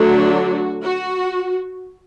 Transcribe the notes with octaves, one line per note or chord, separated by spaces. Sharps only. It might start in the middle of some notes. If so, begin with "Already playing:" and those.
Already playing: D3 F#3 A3 D4
F#4
F#4